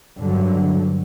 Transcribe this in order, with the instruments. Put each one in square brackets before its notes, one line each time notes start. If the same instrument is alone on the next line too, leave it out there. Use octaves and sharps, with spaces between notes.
[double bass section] G2 D3 F#3